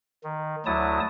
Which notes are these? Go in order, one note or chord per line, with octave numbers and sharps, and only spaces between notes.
D#3
D2 F#3 E4 A5 D#6